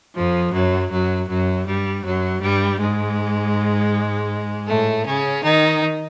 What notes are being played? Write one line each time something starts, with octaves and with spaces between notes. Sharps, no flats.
F2 F3
F#2 F#3
F#2 F#3
F#2 F#3
G2 G3
F#2 F#3
G2 G3
G#2 G#3
A2 A3
C#3 C#4
D#3 D#4